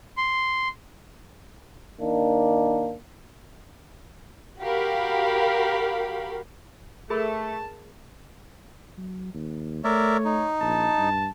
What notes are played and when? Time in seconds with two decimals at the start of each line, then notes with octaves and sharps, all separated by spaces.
0.17 C6
2.00 D#3 A#3 D4 D#4
4.59 F#4 G4 A#4 F5 B5
7.10 A3 G#4 A#4 A5 B5
8.98 F#3
9.34 D#2
9.84 A3 A#4 C#5 D5 E5
10.25 D#4
10.61 A#1 A5
10.98 G2